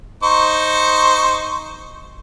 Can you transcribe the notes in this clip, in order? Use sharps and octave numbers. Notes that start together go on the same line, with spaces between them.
D#4 C5 C#6